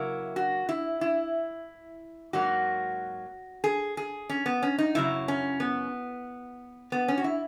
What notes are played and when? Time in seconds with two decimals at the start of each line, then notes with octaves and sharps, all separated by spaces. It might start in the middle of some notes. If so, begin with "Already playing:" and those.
Already playing: C#3 F#3 A#3 E4
0.36 F#4
0.69 E4
1.01 E4
2.33 G#2 F#3 A#3 F#4
3.64 G#4
3.97 G#4
4.29 C#4
4.46 B3
4.63 C#4
4.78 D#4
4.95 F#2 C#3 F#3 E4
5.28 C#4
5.60 B3
6.92 B3
7.08 C#4
7.18 F#4
7.24 E4